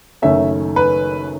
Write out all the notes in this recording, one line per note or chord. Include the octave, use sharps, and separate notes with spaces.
F#1 F#2 D#3 A3 C#4 E5
B4